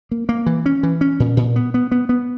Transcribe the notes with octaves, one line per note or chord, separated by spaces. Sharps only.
A#3
A#3
E3
C#4
E3
C#4
A#2
A#2
B3
B3
B3
B3